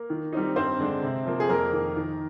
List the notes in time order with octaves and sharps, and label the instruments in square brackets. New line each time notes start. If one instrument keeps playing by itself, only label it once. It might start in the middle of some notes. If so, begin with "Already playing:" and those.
Already playing: [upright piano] A#3 A#4
D#3
G3 C4 D#4
G2 C4 C5
D3 G#3 D4
C3
F3 A#3
G#4
F2 A#3 A#4
D#3 A#3
D#3